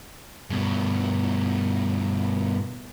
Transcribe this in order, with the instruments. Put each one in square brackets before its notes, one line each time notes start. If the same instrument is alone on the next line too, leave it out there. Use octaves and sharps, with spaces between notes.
[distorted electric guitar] G2 B2